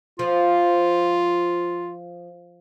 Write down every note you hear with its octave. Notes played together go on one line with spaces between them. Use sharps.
F3 F4